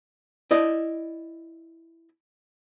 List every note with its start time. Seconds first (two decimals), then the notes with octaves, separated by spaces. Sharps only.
0.51 E4 D5 D#5